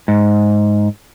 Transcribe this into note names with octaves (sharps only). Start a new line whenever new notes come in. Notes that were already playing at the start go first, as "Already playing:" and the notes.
G#2